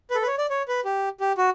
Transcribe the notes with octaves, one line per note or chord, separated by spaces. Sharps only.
B4
A4
B4
C#5
D5
C#5
B4
G4
G4
F#4